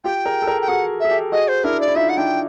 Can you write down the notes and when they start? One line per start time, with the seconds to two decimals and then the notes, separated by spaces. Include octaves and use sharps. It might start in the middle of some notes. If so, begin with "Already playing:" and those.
0.04 F4 G4 G5
0.26 G#4 A#4
0.42 A4
0.47 G#4 A#4
0.61 G5
0.68 F#4 G#4 F#5
1.00 G#4 E5
1.11 G4 A4
1.32 F#4 G#4 D#5
1.48 C5
1.64 D4 E4 A#4
1.80 D5
1.88 E4
1.96 D#4 F4 E5
2.09 F#5
2.17 D4 E4 G5